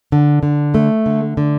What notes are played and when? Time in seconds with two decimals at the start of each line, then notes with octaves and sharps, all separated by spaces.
0.12 D3
0.43 D3
0.75 A3
1.06 D3
1.37 D3